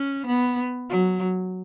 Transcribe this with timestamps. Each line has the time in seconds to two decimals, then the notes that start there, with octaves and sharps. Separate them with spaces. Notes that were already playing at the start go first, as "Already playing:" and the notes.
Already playing: C#4
0.26 B3
0.89 F#3